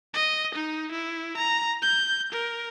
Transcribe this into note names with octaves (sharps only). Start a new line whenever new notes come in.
D#5
D#4
E4
A#5
G6
A#4